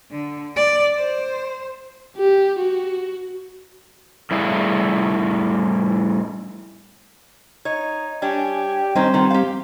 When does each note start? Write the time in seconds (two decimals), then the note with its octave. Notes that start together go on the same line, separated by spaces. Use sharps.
0.11 D3
0.56 D5
0.98 C5
2.17 G4
2.60 F#4
4.31 A2 G3 E4 G#4 F5
7.65 D#4 C#5
8.22 G3 D4 G4 C#5 G#5
8.95 D#3 G3 C4 C#4 D#4 C5
9.14 D#3 F3 B3
9.30 G4 F5